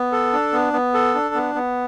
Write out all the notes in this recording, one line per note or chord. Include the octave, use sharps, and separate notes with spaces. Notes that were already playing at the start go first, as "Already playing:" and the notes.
Already playing: B3
A4
D4
B3
B3
A4
D4
B3
B3